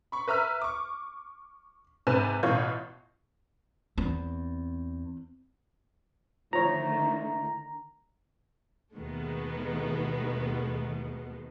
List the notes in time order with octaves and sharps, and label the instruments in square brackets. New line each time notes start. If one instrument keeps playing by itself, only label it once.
[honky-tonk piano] B5 C#6
B4 E5 A#5 E6 F6
C#6 D6
G#2 C3 B4 G#5 G6 E7
A1 B2 E3 F4 C#5 G6
[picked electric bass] E2 [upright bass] C4
[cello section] D3 D#3 A3 [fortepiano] F3 C#5 [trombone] E4 [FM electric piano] A#5
[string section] D#2 B2 D#3 G#3 A3 B3